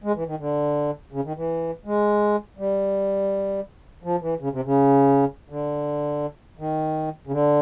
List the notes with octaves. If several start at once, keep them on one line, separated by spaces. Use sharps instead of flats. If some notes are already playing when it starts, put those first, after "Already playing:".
G#3
E3
D#3
D3
C#3
D#3
E3
G#3
G3
F3
E3
C#3
C3
C#3
D3
D#3
C#3
D3